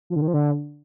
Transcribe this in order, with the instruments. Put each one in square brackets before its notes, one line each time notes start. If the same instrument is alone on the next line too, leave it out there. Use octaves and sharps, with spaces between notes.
[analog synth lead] F3
D3
D#3
F3
D3